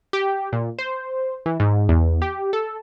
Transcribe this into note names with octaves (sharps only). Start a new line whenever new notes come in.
G4
A#2
C5
E3
G#2
E2
G4
A4